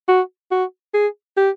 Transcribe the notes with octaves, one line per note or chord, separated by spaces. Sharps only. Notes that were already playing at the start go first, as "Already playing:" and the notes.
F#4
F#4
G#4
G4